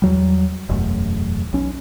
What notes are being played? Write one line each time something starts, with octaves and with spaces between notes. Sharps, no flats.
E2 F#3 G3
E1 A1 F#2 A2
B1 C#4